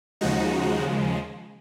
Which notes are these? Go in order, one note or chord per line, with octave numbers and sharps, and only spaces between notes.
D#2 C#3 F3 G#3 D#4 F#4